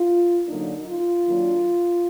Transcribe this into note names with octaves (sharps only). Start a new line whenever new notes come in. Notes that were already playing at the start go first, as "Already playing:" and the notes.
Already playing: F4
D3 F#3 A#3 D4 D#4
F4
D#3 F#3 A#3 D4